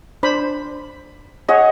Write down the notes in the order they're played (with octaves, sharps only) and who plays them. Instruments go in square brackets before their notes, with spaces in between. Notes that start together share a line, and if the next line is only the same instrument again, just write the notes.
[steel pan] D4 C5 B5
[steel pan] G#4 C#5 [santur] D#5 F#5